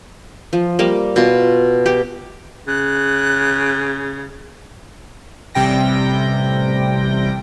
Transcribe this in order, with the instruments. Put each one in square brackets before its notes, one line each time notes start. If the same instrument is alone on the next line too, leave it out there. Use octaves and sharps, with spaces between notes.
[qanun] F3
G3 A#3
B2 F4
G4
[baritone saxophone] C#3 [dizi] F#6
[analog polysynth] A1 C3 G3 G5 A#6